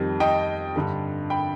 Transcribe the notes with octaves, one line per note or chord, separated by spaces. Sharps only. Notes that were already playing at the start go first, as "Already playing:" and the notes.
Already playing: F2 D#3 G3
D#5 G5
G2 D3 G3
G5 B5